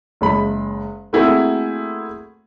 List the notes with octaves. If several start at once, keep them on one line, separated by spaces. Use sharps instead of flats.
F#1 G#3 B5
A3 A#3 C4 E4 F#4 G#4